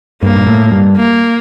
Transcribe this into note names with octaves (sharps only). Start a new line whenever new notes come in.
G2 A#3
A#2
A2
G2
A#3